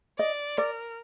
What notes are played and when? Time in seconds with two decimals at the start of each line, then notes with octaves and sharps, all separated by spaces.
0.19 D5 D#5
0.58 A#4 D5